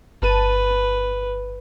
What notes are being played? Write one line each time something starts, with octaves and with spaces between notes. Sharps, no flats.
G1 B4 A5 D#7